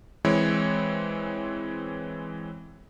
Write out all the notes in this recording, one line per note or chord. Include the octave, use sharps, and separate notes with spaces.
E3 G#3 C4 E4 C#5